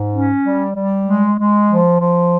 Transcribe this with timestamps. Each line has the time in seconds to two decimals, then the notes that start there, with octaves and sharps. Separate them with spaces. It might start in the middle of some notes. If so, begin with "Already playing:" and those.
Already playing: G#2
0.13 C#4
0.45 G3
0.76 G3
1.07 G#3
1.38 G#3
1.69 F3
2.00 F3